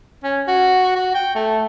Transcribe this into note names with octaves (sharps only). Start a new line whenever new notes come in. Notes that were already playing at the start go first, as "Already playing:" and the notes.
C#4
F#4
F#4
G5
A3